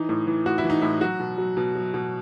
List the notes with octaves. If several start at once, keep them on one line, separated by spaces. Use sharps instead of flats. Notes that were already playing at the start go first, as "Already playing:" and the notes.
Already playing: E3 D#4
A2
E3
A2 F#4
E4
E3
D#4
A2 E4
F#3 F#4
B2
F#3
B2
F#3
B2